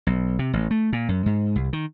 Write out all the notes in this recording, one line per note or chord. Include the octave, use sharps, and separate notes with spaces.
B1
C3
A1
A3
A#2
F#2
G#2
C2
D#3